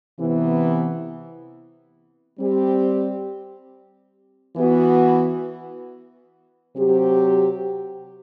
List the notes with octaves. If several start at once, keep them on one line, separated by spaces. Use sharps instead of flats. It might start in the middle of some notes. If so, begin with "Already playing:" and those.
C3 E3 B3
G3 C4 G4
E3 B3 F#4
C3 F#3 C4 G4